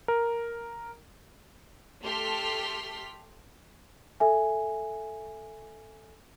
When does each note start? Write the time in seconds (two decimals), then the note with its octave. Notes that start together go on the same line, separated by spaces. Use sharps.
0.08 A#4
2.02 A3 G4 A4 C6 F6 B6
4.20 A4 E5 G#5